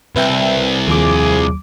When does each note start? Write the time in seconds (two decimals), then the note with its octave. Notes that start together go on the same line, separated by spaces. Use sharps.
0.16 C2 B4 E5 G5
0.87 D#2 F3 G#4 D6